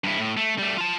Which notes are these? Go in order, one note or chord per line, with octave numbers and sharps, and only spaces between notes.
G2 E4
A2
A3
G3 A3
F4 A5